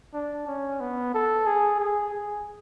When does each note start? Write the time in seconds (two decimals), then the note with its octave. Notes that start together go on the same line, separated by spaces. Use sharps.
0.14 D4
0.47 C#4
0.80 B3
1.14 A4
1.47 G#4
1.80 G#4
2.14 G#4